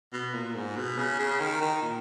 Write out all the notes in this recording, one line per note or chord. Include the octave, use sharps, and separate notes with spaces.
B2
A#2
G#2
B2
C#3
C#3
D#3
D#3
A#2